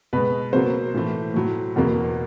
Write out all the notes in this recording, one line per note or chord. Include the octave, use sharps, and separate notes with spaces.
B2 G#3 B4
B2 F#3 A#3 C5
A2 E3 A3
A2 F#3 A3
E2 B2 F#3 A#3